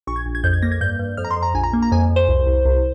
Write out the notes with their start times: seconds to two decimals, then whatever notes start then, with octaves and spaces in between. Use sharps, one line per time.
0.07 A#1 C#6
0.16 G#6
0.26 A#1
0.35 G#6
0.44 F2 G6
0.53 G#6
0.62 A#3 A#6
0.72 G#6
0.81 G2 G6
0.99 G2
1.17 F2 F6
1.25 A#5
1.31 C6
1.36 F2
1.43 A#5
1.54 A#1 G#5
1.64 A#5
1.73 A#3
1.82 A#5
1.92 F2 G#5
2.10 F2
2.16 C5
2.29 C2
2.47 C2
2.65 C2